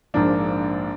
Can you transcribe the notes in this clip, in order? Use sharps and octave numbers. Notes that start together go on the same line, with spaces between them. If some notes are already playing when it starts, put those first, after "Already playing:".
A#1 G#2 F3 A#3 D4